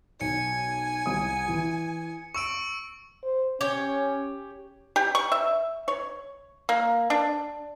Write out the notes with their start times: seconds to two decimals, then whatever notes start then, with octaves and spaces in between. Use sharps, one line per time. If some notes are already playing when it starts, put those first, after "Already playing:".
0.21 B1 G#5 C#7
1.06 C2 D#6
1.48 E3
2.34 C#6 E6 C#7 D7 E7
3.23 C5
3.61 C#4 G4 C#5
4.96 G4
5.15 C#6
5.32 E5
5.88 C#5
6.69 A#3
7.10 D4